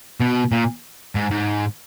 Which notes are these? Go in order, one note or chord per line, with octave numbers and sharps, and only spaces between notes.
B2
A#2
G#2
G#2